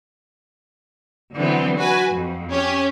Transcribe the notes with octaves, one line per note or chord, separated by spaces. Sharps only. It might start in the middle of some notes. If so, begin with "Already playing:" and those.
D3 E3 F#3 B3 C4
F#4 B4 G#5
F2
C#4 G4 C#5